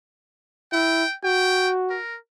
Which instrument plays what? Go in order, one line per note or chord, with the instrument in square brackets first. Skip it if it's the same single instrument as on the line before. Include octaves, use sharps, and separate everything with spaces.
[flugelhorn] E4 [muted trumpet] G5
[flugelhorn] F#4 [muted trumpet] G5
[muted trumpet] A#4